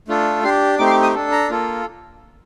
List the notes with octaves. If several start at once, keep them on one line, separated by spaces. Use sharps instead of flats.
A3 D4 F4 A4
D4 G4 C6
A3 C4 D#4 G4 D6
C6
D6
D#6
D4 A4
A#5
A#3 F4 A4